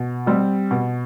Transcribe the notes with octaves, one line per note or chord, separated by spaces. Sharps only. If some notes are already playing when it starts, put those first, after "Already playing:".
Already playing: B2
G3 C4 G4
B2